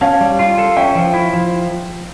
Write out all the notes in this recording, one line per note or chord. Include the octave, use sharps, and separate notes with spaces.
C#4 F5 A5
G3
F4
A4
C#4 E5 G5
F3
E4
F3